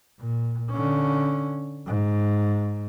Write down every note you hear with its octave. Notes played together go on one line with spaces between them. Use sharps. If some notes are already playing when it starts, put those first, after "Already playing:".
A#2
D3 C#4
G#2